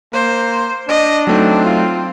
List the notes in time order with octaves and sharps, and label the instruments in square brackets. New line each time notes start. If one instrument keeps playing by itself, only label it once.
[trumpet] A#3 [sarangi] C5
[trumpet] D4 [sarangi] D#5
[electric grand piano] F#3 A3 D#4 [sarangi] C4
[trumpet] F4